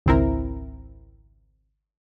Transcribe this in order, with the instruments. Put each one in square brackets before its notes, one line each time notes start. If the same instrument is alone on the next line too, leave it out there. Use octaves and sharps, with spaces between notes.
[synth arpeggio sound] G#1 C#2 C4 E4 A#4